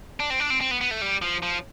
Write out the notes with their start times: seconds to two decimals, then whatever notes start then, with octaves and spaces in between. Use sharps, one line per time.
0.20 D4
0.30 C4
0.40 D4
0.50 C4
0.61 C4
0.71 B3
0.81 B3
0.91 A3
1.02 G3
1.22 F3
1.43 F3